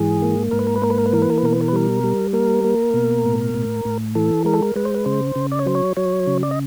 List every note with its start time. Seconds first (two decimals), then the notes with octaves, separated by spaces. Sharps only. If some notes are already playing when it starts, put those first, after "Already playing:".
Already playing: G#2 E3 G#4
0.22 A#3
0.51 G#2 A#4
0.59 B4
0.67 A#4
0.76 B4
0.82 A#3 A#4
0.90 B4
0.98 A#4
1.06 B4
1.13 E3 A#4
1.22 B4
1.30 A#4
1.38 B4
1.42 B2 A#4
1.53 B4
1.61 A#4
1.68 B4
1.73 G3 A#4
2.04 G3
2.33 A#3 A#4
2.64 A#3
2.94 B2
3.25 A2
3.54 A2
3.85 A2
4.15 E3 A4
4.45 G#3 A#4
4.54 A4
4.63 A#4
4.76 G#3 B4
4.85 C5
4.94 B4
5.06 C#3 C5
5.36 C#3
5.52 D5
5.59 C#5
5.66 F#3 C5
5.75 C#5
5.97 F#3 C#5
6.27 C#3
6.43 D5
6.51 D#5